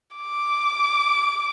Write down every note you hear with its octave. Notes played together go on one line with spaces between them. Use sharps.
D6